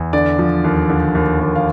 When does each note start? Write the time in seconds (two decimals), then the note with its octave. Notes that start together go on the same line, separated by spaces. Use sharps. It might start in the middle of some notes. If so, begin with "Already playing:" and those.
Already playing: E2
0.13 D3 D5
0.39 F3
0.64 D#2
0.89 D3
1.15 D#2
1.40 D#2
1.55 F5